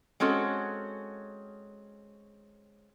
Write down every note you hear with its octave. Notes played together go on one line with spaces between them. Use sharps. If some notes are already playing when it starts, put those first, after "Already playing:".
G#3 C4 C#4 F#4 A4